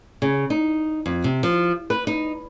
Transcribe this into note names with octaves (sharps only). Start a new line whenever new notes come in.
C#3
D#4
F2
C3
F3
B4
D#4